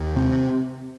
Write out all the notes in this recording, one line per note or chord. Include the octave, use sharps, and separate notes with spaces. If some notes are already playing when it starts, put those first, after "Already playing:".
Already playing: D#2
C3 C4